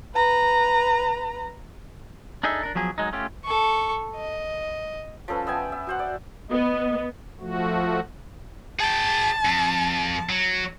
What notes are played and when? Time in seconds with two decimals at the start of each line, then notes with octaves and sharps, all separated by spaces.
0.15 B4 A#5
2.43 D4 D#4 G#4 A4 E5
2.63 D4 A#4
2.75 F3 F#3 B3 G#4
2.98 F#3 G#3 D#4
3.13 A3 C#4 F4 G4
3.45 A4 C#6
4.16 D#5
5.28 F3 C#4 A4 B4
5.47 B3 E5 G5 G#5
5.72 E5
5.87 F#4 C5 F#5
5.99 D5
6.51 B3 D#5
7.40 F3 A3 F#4
8.80 G#4 G5 A5
9.45 F2
10.29 F#3